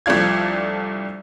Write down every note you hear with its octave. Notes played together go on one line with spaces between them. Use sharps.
C2 F3 A3 D4 F4 G#6